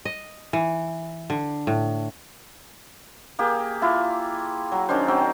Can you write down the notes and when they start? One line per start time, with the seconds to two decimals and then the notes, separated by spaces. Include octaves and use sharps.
0.05 D#5
0.53 E3
1.30 D3
1.67 A2
3.39 A#3 G4 G#4
3.82 E4 F4
4.72 F#3
4.89 D#3 C#4 D4 C5
5.08 F#3 C4 G5